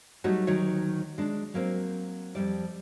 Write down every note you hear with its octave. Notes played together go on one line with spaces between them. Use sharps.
F#3 G3 A3 D#4 F#4 C#5
D2 D#3 F#3 C#5
G#3 D4
F#3 A#3 C4
F2 G3 D5